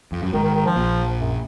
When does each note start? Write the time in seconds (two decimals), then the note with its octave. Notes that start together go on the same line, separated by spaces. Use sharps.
0.12 F2
0.23 F#2
0.33 G#1 G#2 D#3
0.44 D#3
0.54 D#3
0.65 F3
0.76 A#1 A#2
1.19 F#2